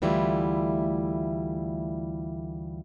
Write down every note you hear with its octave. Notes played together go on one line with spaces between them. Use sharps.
D2 E3 G3 A3 E4 F4